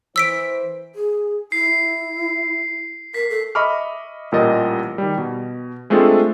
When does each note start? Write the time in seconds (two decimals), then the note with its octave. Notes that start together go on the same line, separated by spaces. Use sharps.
0.16 E3 C5 E6 B6 D7
0.95 G#4
1.52 E4 C7
3.14 A#4 B6
3.30 A4
3.55 D#5 E5 B5 C#6 D6 F6
4.32 A1 A#2 G3 A#4 D#5 A6
4.98 D#3 G3
5.18 B2
5.90 G#3 A3 C4 D4 F4 A4